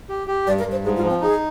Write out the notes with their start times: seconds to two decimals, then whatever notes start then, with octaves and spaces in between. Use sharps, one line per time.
0.09 G4
0.28 G4
0.46 G2 D5
0.59 A#4
0.65 G2
0.72 C5
0.84 G#2 G#4
0.96 F4
1.04 F3
1.09 C4
1.21 D#4 G#4